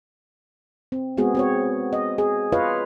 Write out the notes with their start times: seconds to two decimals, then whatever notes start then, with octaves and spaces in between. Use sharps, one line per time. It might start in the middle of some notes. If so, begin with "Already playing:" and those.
0.92 C4
1.17 G#3 B3 C4 F#4 G#4
1.35 C4 F#4 C#5
1.93 D#5
2.18 G#4
2.52 F4 B4 C#5 D#5 F5